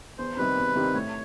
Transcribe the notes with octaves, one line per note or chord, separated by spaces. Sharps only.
E2 C5
C3 D#3 G3 C4 B4
E2
C3 D#3 G3 C4
A2 C#5